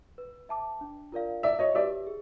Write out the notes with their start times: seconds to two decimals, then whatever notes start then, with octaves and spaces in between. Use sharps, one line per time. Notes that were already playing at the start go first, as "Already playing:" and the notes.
0.18 B4
0.49 E5 A5 D6
0.81 D4
1.12 F4 A#4 D5 F5
1.43 E4 D5 E5
1.59 C#5 D#5
1.75 G4 B4 D5 E5
2.07 G#4